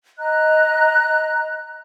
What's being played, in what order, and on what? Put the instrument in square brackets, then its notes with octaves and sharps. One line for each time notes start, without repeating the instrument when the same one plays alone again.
[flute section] D#5 A#5 F#6